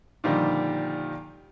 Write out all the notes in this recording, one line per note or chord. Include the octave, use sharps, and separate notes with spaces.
A#2 D3 D#3 F3 G3